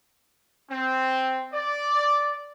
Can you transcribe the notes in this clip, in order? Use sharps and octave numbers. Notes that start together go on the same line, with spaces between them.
C4
D5